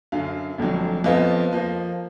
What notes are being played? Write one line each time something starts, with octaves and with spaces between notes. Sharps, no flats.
F#2 D3 F#3 F5
F1 F2 D3 F#3
F2 F3 B3 F4 D#5
F3 A#3